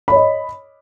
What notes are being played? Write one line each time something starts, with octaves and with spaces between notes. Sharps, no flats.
C#5 D#5 B5